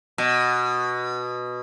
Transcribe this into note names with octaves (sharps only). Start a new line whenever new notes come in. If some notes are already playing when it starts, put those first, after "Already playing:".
B2